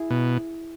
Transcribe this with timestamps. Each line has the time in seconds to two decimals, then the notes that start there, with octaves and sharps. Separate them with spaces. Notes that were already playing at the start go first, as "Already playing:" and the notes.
Already playing: E4 G#4
0.11 B2